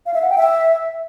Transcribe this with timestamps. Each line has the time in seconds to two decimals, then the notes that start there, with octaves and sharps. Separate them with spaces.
0.06 F5
0.14 E5
0.22 F#5
0.30 G5
0.38 E5